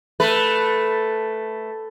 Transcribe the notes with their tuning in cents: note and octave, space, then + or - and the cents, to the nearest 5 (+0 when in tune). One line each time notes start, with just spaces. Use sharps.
A3 +0 B4 +0